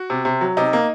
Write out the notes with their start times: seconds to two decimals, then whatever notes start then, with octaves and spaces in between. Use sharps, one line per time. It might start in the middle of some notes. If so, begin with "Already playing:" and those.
Already playing: F#4
0.10 C3
0.25 C3
0.41 F#3
0.57 C3 D#4
0.73 A#3